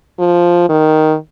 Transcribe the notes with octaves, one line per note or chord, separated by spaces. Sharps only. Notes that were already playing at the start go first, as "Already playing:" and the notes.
F3
D#3